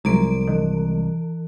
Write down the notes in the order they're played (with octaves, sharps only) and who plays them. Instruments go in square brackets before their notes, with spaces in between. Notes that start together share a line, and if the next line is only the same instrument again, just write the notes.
[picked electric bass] C2 [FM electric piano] F3 F#3 G#3 [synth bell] A#5 D7
[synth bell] E3